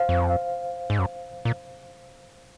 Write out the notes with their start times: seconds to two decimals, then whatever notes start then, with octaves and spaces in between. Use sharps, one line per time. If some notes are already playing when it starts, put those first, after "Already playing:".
Already playing: C5 F5
0.09 F2
0.90 G#2
0.99 F#2
1.45 A#2